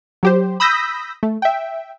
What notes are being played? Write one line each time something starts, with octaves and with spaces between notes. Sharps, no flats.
F#3 G4 C5
B5 D#6 E6 G6 A#6 B6
A3
E5 G5